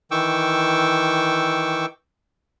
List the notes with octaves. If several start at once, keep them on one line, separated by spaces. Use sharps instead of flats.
D#3 E3 G5 C#6 D6 E6